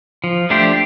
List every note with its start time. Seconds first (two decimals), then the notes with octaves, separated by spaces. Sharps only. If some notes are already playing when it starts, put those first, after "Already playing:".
0.24 F3
0.50 A3 D4 G4 C5